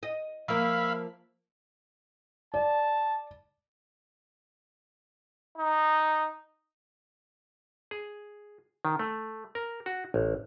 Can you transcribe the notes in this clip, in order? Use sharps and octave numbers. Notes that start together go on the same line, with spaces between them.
D#5
F3 A#3 E5 F5 B5
D5 A5
D#4
G#4
D#3
A3
A#4
F#4
A1